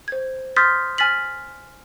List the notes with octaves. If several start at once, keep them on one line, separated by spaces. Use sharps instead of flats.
C5 G#6
C6 D#6 F6 G6 A6 B6
G#5 F6 A6 B6 F#7